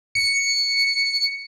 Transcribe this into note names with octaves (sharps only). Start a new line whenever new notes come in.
C#7